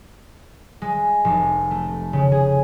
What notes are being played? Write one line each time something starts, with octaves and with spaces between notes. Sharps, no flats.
G#3
F1
A3
C#3
G#4